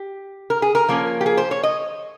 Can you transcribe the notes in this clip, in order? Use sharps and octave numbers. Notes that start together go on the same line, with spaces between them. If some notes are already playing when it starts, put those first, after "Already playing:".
Already playing: G4
A#4
G#4
A#4
F3 A#3 C#4
G4
G#4
C5
C#5
D#5